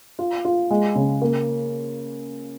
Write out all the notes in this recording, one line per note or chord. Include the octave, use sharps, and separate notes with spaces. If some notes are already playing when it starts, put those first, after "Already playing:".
F4
F4
G#3
C#3
A#3